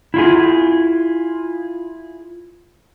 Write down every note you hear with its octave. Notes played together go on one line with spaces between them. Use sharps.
E4 F4 G#4